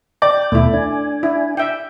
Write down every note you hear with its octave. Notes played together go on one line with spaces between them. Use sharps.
D5 G5
D#2 B2 A3 E4
D4 G#5
E4
E5 G5